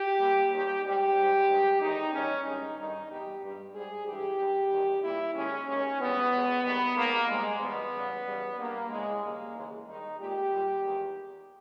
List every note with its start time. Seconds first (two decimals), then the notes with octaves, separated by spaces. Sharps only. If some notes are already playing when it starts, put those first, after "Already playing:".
Already playing: G4
0.19 A#2 G3
0.51 D#2 D#3 G3 G4
0.83 G#2 G3 G4
1.16 G#2 G3
1.48 G2 D#3 G#3
1.79 E2 D#3 G#3 D#4
2.12 E2 D#3 G3 C#4
2.44 G2 D#3 G#3 D#4
2.76 G2 D#3 G3 D#4
3.09 E2 B2 G3 G4
3.41 G2 G3
3.73 G#2 G3 G#4
4.06 G2 E3 G#3 G4
4.38 G2 G3
4.70 E2 D#3 G3
5.02 A#2 G3 E4
5.34 D#2 D#3 G#3 C#4
5.66 D#2 D#3 G#3 C#4
5.99 G#2 E3 G3 B3
6.31 E2 B2 G#3
6.63 D#2 D#3 G3 B3
6.96 D#2 D#3 G#3 A#3
7.28 G#2 G3 G#3
7.60 E2 B2 G3 B3
7.93 E2 C#3 G3
8.25 E2 C#3 G3
8.57 G2 G3 A#3
8.89 E2 C#3 E3 G#3
9.21 D#2 C#3 G3 A#3
9.54 D#2 C#3 E3 G#3
9.86 D#2 D#3 G3 D#4
10.18 A#2 G#3 G4
10.50 A#2 G3
10.82 E2 D#3 G#3